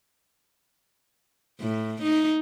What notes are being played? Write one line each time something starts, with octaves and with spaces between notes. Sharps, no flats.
A2
D#4